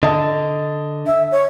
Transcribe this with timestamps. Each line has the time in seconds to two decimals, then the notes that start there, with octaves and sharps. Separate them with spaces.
0.03 D3 D#5 A5
1.07 E5
1.32 C#5